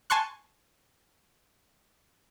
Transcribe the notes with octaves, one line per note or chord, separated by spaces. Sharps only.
G#5 A5 C6 C#6 F#6